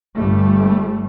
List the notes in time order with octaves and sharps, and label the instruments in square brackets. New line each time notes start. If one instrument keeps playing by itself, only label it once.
[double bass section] G1 G3 A3